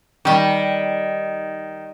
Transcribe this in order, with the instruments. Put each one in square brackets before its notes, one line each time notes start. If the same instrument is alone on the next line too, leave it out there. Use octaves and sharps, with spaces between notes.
[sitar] D#3 [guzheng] G3 G4